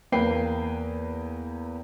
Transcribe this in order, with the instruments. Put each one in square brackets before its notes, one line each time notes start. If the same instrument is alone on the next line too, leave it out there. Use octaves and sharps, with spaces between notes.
[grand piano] E2 A#3 B4 G5 C7